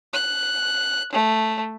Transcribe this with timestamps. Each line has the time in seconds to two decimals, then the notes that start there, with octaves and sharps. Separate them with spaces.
0.14 F#6
1.12 A3